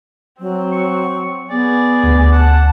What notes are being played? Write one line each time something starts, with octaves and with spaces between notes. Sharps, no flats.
F#3 C4
C#6
B3 G#4 D5
D2
F#5 A5